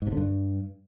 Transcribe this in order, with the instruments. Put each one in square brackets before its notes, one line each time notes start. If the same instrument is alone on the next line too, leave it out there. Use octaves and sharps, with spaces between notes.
[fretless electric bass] G#2
C3
D3
G2